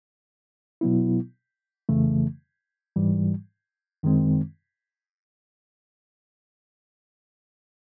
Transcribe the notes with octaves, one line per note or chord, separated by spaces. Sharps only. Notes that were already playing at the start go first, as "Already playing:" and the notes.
B2 F#3 B3 E4
F2 C#3 E3 A3
G#2 E3 G3
F#2 D#3 G#3 C4